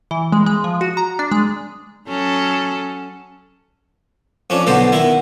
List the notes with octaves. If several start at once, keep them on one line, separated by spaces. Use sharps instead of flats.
E3
G#3
G#3
F3
F#4
A#5
D4
G#3
F#3 C#4 A4
F2 C#4 D4
B1 B2 D3 B3 C5 D6
D#3 B3 E4